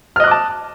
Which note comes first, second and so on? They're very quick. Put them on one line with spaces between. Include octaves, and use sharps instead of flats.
F6 D#5 F#6 D6 A5